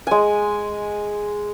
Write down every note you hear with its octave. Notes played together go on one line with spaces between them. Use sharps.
G#3 G#5